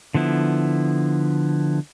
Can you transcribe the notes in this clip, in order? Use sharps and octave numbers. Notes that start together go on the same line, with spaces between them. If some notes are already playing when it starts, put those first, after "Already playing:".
D3 F3 B3 E4